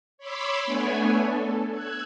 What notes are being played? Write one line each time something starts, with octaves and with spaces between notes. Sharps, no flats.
C#5 B5 C6 D6 E6
A3 B3 D4 C#5 G#5
A4
E6 F#6 G#6